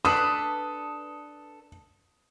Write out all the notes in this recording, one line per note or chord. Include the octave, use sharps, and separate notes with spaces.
D4 A4 B4 D#6